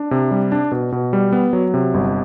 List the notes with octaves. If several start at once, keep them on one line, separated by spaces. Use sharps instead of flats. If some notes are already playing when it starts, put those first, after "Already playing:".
Already playing: D4
C3
G3
D4
B2
B2
G3
B3
F#3
C3
G1